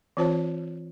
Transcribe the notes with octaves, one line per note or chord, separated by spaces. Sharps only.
E3 C4 F4 C5 C#5 A5